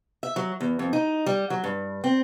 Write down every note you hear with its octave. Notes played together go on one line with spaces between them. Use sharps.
E5
F#3
E2
F2
D#4
G3
F#3
G2
C4